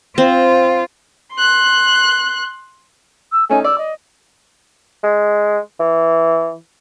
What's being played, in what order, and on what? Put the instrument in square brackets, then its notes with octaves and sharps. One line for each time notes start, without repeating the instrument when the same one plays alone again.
[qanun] C4 [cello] F4
[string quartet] C6 F#6
[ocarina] E6
[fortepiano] A3 C#4 D#4 [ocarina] G#5
[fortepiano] D5 [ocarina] E6
[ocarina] D#5
[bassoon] G#3
E3